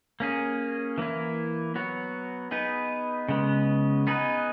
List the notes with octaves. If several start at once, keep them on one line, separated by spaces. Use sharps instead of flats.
A#3 C#4 G#4
E3 A#3 E4
F#3 B3 F#4 C#5
B3 D#4 G#4 B4
C#3 G#3 B3
B3 D#4 G#4 B4